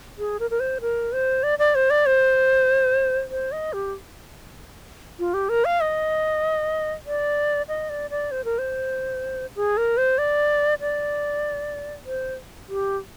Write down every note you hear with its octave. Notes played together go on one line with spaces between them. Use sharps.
G#4
A#4
A#4
C5
A#4
C5
D5
D5
C5
D5
C5
C5
D#5
G4
F4
G4
A#4
F5
D#5
D5
D#5
D5
D5
C5
A#4
C5
G#4
A#4
C5
D5
D5
C5
G4